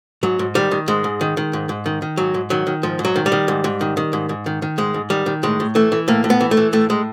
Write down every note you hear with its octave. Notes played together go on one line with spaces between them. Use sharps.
G#2 F#3
G#2
D#3 G3
D#3
G#2 G#3
G#2
D#3
D#3
G#2
G#2
D#3
D#3
G#2 F#3
G#2
D#3 F#3
D#3
G#2 F3
G#2
F#3
D#3
G3
D#3
G#2
G#2
D#3
D#3
G#2
G#2
D#3
D#3
G#2 G#3
G#2
D#3 G3
D#3
A2 G#3
A2
E3 A3
E3
A2 A#3
A2
B3
E3
A3
E3
A2 A3
A2 G#3